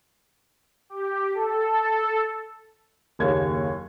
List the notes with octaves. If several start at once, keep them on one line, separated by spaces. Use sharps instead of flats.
G4
A4
F#1 D#2 C#5 G#6